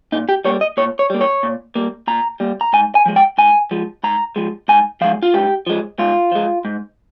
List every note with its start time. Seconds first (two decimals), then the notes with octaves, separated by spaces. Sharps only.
0.12 A#2 D#4
0.29 G4
0.45 G3 A#3 C#5
0.61 D#5
0.77 A#2 C#5
0.99 C#5
1.10 G3 A#3
1.21 C#5
1.43 A#2
1.75 G3 A#3
2.07 A#2 A#5
2.40 G3 A#3
2.61 A#5
2.73 G#2 G#5
2.95 G#5
3.06 F3 G#3
3.16 G5
3.38 G#2 G#5
3.71 F3 G#3
4.04 G#2 A#5
4.36 F3 G#3
4.68 G#2 G#5
5.01 F3 G#3 F5
5.23 F4
5.34 G#2 G4
5.67 F3 G#3
5.99 G#2 F4
6.32 F3 G#3
6.65 G#2